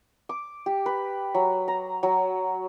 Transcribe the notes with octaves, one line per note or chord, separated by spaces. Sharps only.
D6
G4
B4
F#3
A#5
F#3